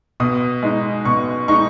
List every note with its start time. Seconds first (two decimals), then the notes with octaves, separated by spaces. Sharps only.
0.20 B2 D#6
0.63 G#3 D#4
1.05 B2 C#6
1.48 G#3 D#4 C#6